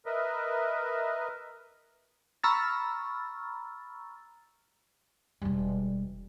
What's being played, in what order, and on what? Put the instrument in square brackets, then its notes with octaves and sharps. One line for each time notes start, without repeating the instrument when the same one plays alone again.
[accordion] A#4 B4 D#5 E5
[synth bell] A#5 B5 C#6 E6 F6 A6
[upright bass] E1 G3